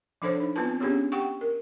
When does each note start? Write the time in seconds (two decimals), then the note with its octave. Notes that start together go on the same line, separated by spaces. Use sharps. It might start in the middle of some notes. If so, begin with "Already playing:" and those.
0.22 F3 D4 A4 C5 C#5
0.40 D#4
0.56 B3 C4 E4 F4 B4 A5
0.80 B3 C#4 D4 G4 G#4 C#5
1.12 G4 F#5 G5 C#6
1.41 A#4